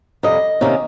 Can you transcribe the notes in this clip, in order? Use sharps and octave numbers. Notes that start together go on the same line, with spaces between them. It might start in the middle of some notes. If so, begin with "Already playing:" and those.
F2 C3 G3 D#5
C3 D#3 A#3 C#4